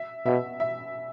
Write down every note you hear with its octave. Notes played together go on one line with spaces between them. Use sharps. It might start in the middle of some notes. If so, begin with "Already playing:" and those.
Already playing: E5
B2 E5
E5